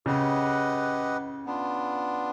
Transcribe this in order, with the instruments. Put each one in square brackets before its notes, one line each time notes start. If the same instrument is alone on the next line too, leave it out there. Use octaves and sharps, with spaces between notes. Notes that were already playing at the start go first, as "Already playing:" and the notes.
[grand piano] C#3 [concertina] G4 B4 D#5 F#5
[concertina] B3 D4 F4